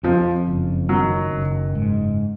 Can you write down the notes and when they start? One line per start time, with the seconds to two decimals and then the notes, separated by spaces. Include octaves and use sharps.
0.03 F2 F3
0.46 F#1
0.89 D#3 F#3
1.31 F#1
1.75 G#2